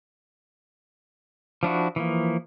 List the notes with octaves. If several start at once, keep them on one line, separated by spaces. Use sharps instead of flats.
F3 D4 E4 F#4
E3 F3 A#3